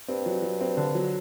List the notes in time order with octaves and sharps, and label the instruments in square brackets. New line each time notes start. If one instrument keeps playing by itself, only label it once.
[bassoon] G2 [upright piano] C4
[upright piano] F#3
F#3
C4
D3
F#3